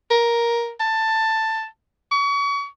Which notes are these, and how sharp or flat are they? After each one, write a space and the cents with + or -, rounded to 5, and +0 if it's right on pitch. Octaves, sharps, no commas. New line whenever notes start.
A#4 +10
A5 +10
C#6 +35